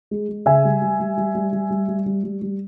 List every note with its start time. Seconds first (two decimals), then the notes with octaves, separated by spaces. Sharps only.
0.11 G#3
0.29 G#3
0.46 C#3 E5 G#5
0.64 G3
0.82 G3
1.00 G3
1.17 G3
1.35 G3
1.53 G3
1.70 G3
1.88 G3
2.06 G3
2.24 G3
2.42 G3